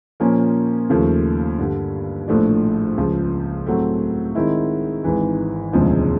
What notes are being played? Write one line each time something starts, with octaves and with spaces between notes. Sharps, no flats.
A#2 F3 A#3 C#4
D#2 C#3 F3 A3
G2 D3 G3
A#1 A2 F3 A3 D4
C#2 C#3 F3
A2 F#3 A3 C4
D#3 G#3 C4 E4
G#1 G#2 E3
E1 D2 C#3 F3 G#3